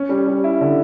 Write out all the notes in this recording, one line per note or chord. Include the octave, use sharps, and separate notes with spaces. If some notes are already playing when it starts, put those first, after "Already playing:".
Already playing: C#4
G3
G3
E4
D3